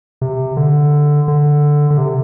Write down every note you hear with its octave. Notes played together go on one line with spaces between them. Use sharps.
C3
D3
D3
D3
C3